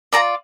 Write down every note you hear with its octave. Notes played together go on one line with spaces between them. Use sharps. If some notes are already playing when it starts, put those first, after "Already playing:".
F4 A4 D5 A#5